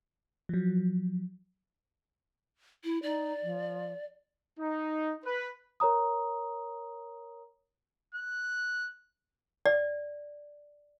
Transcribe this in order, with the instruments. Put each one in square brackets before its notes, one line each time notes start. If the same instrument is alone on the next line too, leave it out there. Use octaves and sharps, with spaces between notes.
[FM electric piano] F3 F#3
[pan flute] E4
[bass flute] D#4 [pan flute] D5
[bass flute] F3
[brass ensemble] D#4
B4
[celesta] A#4 C#5 A#5 D#6
[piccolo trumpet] F#6
[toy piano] D5